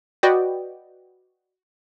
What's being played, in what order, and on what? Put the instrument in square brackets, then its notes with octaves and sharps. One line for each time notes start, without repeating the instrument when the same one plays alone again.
[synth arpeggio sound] F#4 B4 D5 D#5 G5